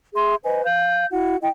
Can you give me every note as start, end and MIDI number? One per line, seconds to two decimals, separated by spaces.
0.15 0.35 68
0.15 0.35 76
0.15 0.35 84
0.44 0.64 71
0.44 0.64 72
0.44 0.64 75
0.44 0.64 80
0.64 1.05 77
0.64 1.05 91
1.12 1.36 64
1.12 1.36 66
1.12 1.36 78
1.41 1.48 64
1.41 1.48 75
1.41 1.48 79